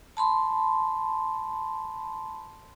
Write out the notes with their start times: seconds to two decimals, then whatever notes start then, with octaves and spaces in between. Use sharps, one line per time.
0.17 A5 B5 C6